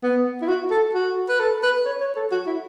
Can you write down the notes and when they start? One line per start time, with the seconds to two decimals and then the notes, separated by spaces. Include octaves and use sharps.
0.03 B3
0.42 E4
0.48 F#4
0.71 A4
0.94 F#4
1.29 B4
1.40 A4
1.63 B4
1.86 C#5
2.01 C#5
2.16 A4
2.32 F#4
2.47 E4